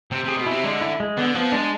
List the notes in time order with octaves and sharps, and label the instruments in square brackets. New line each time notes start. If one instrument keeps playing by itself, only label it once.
[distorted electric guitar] C3 [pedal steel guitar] C4
[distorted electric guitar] C3 [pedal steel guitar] G#4
[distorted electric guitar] B2
[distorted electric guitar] C3 [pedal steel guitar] E4
[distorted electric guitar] D3 [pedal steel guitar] G#3
[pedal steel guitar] E4
G#3
[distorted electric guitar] D3 [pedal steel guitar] B3
[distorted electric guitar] F3 [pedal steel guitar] B3
[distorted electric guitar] G#3 [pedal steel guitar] D4